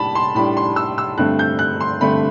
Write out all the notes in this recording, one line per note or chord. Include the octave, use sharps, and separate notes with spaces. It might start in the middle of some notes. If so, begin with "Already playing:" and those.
Already playing: A2 G3 D4 A5 B5
C6
A2 G3 D4 B5
C6
E6
E6
G2 D3 A3 C4 F#6
G6
F#6
C6
G2 D3 A3 C4 B5